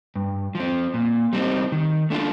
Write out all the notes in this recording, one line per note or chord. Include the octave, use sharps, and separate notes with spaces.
G2
F3 C4
A#2
G3 C4 D#4
D#3
A3 D4 F4